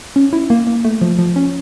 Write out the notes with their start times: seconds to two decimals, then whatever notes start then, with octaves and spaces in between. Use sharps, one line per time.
0.16 C#4
0.33 E4
0.50 A#3
0.67 A#3
0.85 A3
1.01 F3
1.19 F3
1.36 C#4